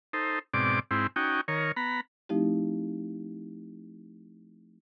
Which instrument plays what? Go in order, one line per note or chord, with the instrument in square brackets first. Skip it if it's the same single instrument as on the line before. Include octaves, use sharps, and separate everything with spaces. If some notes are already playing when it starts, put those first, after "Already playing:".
[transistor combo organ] D#4 A4 C5
G#2 B2 C4 D5 D6
G#2 C4 E4
C#4 D#4 F#4 G5
D#3 A#4 C#5
B3 A#5 B5
[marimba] F3 A3 C4 D#4 E4 G4